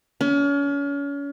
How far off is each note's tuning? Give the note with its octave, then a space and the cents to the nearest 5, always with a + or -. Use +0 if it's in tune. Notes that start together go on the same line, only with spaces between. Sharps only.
C#4 +35